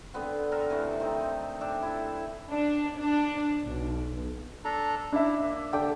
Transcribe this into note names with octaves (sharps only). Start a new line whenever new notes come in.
D3 B3 C4
B3 A4 A#4 C5
C3 E3 A3
D#3 C4 D#4
D4 G4 E5
E4 A4
D4
D4
B1
D4 A4 A#5
D4 E4 E5
A#3
D#2 D3 G4 G5